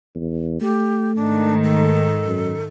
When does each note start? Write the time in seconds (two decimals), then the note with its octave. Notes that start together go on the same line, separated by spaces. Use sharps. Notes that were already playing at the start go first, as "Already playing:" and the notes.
0.15 E2
0.61 A3 G4
1.16 G#2 D#3 D4
1.64 A4
2.26 F#2